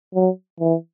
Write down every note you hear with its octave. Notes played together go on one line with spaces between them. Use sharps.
F#3
E3